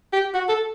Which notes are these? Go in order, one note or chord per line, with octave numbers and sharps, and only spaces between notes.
G4
F#4
A4